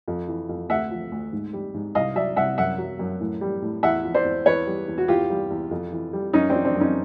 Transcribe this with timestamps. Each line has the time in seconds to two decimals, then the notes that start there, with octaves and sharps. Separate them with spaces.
0.08 F2
0.28 E3
0.49 F2
0.70 D2 E5 F#5
0.91 F3
1.12 D2
1.33 G#2
1.53 G3
1.74 G#2
1.95 C2 D#5 F5
2.16 F#3 D5 E5
2.36 C2 E5 F#5
2.58 F#2 E5 F#5
2.78 F#3
2.99 F#2
3.20 A2
3.41 G3
3.62 A2
3.83 E2 E5 F#5
4.04 F3
4.14 C5 D5
4.25 E2
4.46 E2 B4 C#5
4.67 G3
4.88 E2
4.98 F#4
5.08 E2 F4 G4
5.30 G3
5.50 E2
5.71 F2
5.92 E3
6.13 G3
6.33 F#2 C#4 D#4
6.50 F3 C4 D4
6.65 C4 D4
6.75 F#2
6.81 C#4 D#4